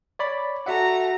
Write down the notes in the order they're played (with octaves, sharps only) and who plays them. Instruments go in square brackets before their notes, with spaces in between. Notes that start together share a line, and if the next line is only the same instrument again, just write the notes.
[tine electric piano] C#5 D5 B5
[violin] A3 A#5 [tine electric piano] F#4 E5 F#5